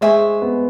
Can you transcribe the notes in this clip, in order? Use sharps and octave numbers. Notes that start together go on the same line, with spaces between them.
G#3 C5 E5 G#5 C#6
B3